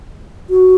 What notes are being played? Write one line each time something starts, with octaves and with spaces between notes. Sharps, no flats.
F#4